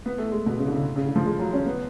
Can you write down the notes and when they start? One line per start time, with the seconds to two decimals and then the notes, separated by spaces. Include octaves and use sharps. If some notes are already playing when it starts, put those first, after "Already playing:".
0.06 B3
0.18 A3
0.31 G#3
0.46 B2
0.59 C#3
0.67 D3
0.73 C#3
0.96 C#3
1.06 D3
1.16 F3
1.26 G#3
1.39 F#3
1.53 C#4
1.66 B3